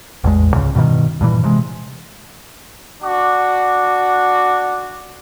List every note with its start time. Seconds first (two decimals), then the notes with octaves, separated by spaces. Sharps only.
0.24 A1 E2 G#3
0.52 C#2 G#2 C#3
0.75 G2 B2 D3 D#3
1.21 G2 A#2 E3
1.43 C3 G#3
3.02 D4 F#4 D6